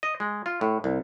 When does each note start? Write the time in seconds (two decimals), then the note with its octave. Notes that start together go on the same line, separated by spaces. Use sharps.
0.03 D#5
0.20 G#3
0.46 F4
0.61 A2
0.84 C2